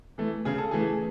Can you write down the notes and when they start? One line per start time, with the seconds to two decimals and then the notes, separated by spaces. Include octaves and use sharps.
0.18 E3 A3
0.45 C#3 G#4
0.58 A4
0.71 E3 A3 G#4